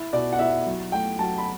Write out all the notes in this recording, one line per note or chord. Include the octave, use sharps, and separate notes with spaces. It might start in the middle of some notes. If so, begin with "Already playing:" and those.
Already playing: E4
B2 D5
F#5
E4 E5
F#3
A3 G5
F#3 A5
B5